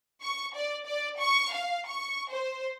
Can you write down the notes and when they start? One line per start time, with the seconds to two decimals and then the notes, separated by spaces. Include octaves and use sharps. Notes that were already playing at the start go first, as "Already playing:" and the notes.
0.23 C#6
0.55 D5
0.86 D5
1.19 C#6
1.53 F5
1.87 C#6
2.31 C5